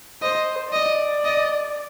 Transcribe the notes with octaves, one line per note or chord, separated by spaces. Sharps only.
C5 D#5
D5 D#5
D#5